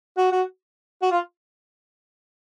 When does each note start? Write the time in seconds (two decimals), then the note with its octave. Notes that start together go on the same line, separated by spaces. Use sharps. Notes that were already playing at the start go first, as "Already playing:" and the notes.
0.17 F#4
0.32 F#4
1.02 F#4
1.11 F4